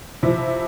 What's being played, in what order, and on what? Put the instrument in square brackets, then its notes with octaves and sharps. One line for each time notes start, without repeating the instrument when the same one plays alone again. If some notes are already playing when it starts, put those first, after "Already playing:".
[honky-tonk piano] C3 F3 E4